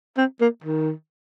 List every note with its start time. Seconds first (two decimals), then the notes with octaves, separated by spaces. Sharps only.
0.18 C4
0.41 A#3
0.64 D#3